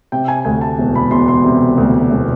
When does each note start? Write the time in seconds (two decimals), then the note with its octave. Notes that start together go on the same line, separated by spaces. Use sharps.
0.12 C3 G5
0.28 G#5
0.45 D2 G#5
0.61 A5
0.78 E1
0.96 B5
1.11 E1 C6
1.28 C6
1.44 C3
1.78 D2
2.10 E1